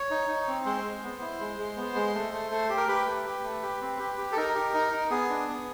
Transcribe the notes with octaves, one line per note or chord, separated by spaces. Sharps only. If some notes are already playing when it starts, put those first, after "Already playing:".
Already playing: C#5
D#4
D#4
C4
G#3 C5
G#3
B3
E4
G#3
G#3
B3
G#3
A3
A3
A3
G4
A#4
G4 B4
A3
G4
A3
G4
C4
G4
G4
A4
D#4 A#4
G4
D#4
D#4
B3 G#4
D4
B3